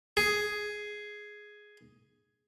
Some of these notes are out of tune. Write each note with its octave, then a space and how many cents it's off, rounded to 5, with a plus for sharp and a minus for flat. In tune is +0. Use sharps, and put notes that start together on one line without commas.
G#4 +5